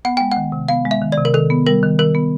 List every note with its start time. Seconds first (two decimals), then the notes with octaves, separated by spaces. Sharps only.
0.05 B3 F#5
0.17 G#3 G5
0.32 D#3 F#5
0.52 C3
0.68 B3 F5
0.85 G#3
0.91 E5
1.01 D#3
1.12 D5
1.18 C3
1.25 A#4
1.34 D#3 A4
1.50 B3
1.67 G3 A#4
1.83 D#3
1.99 D#3 A#4
2.15 B3